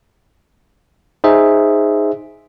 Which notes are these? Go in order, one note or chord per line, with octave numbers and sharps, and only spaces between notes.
D#4 G#4 C5 E5